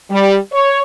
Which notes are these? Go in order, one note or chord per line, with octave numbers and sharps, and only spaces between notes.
G3
C#5